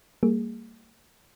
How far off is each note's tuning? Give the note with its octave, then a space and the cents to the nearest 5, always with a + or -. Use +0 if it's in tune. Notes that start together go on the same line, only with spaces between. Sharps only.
G3 +0 A#3 -30 G#4 -5